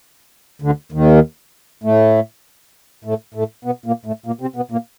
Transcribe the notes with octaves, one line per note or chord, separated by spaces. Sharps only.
D2 D3
D#2 D#3
A2 A3
A2 A3
A2 A3
B2 B3
A#2 A#3
A2 A3
A#2 A#3
C3 C4
B2 B3
A#2 A#3